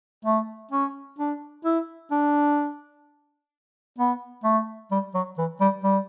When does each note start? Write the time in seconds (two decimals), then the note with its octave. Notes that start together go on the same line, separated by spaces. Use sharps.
0.25 A3
0.71 C#4
1.18 D4
1.65 E4
2.11 D4
3.98 B3
4.44 A3
4.91 G3
5.14 F#3
5.38 E3
5.61 G3
5.83 G3